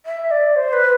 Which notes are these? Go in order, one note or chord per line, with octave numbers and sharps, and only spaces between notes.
E5
D5
C5
B4